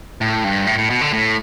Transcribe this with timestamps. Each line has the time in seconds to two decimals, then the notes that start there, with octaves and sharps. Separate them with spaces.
0.21 A2
0.44 G2
0.67 A2
0.78 A2
0.90 B2
1.01 D3
1.13 A2